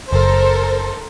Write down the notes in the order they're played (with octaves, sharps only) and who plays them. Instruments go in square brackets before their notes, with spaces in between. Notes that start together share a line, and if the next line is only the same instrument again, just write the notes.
[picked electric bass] F#1 [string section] A4 A#4 C5